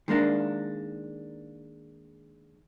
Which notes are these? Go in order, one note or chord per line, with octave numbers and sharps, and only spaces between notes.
D#3 G#3 A#3 D4